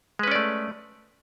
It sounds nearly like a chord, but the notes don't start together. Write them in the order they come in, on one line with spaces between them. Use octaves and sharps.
G#3 B4 C#4 D5 A3